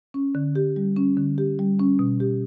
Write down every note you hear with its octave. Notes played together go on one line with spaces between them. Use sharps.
C#4
D3
G4
G3
C#4
D3
G4
G3
C#4
B2
G4